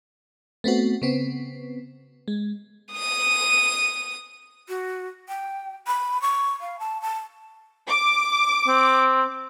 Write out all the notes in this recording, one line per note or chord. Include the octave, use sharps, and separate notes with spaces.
A3 B3 C4 F#4
C#3 B3 C4
G#3
D#6 D#7
F#4
G5
B5
C#6
F5
A5
A5
D6
C4